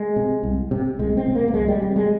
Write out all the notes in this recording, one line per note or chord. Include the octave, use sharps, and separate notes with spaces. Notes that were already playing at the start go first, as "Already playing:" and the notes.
Already playing: G#3
C3
C2
C3
C2 G#3
C4
C3
A#3
A#3
C2 G#3
G3
C3 G3
G#3